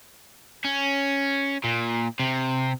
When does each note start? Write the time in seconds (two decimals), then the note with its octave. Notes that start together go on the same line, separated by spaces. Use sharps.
0.64 C#4
1.64 A#2
2.20 C3